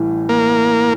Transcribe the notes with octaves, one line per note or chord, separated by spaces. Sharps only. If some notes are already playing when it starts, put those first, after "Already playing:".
Already playing: A1 A2 E3 G3
A#3